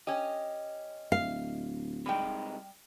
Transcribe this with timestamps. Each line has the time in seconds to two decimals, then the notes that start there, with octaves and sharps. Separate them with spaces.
0.07 C#4 G4 D#5
1.12 D1 F5
2.06 C3 G3 G#3 D#4 G5